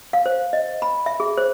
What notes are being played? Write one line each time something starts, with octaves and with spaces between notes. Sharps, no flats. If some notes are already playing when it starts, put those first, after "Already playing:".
F5
C5
D#5
B5
E5
G#4
C5